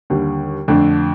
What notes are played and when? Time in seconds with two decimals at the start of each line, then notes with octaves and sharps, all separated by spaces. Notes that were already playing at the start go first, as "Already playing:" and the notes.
0.10 D#2 D3 G3
0.68 F2 D3 A3 D4